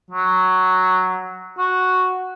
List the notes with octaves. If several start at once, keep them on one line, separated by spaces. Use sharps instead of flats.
F#3
F#4